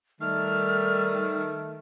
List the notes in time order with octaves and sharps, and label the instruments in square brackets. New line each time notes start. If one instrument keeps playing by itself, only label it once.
[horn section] D#3 A3 [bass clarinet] G3 [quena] F6